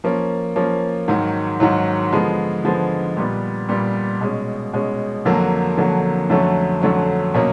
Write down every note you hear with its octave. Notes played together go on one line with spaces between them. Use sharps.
F3 A#3 C#4
F3 A#3 C#4
G#2 D#3 F#3
G#2 D#3 F#3
D3 F3 G#3 B3
D3 F3 G#3 B3
A#2 G3 B3
A#2 G3 B3
B2 G#3 C#4
B2 G#3 C#4
F2 D3 F#3 A#3
F2 D3 F#3 A#3
F2 D3 F#3 A3 C#4
F2 D3 F#3 A3 C#4
B2 F#3 A#3 C#4